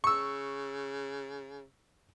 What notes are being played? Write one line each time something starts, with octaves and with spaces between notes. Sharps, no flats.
C#3 C#6 E6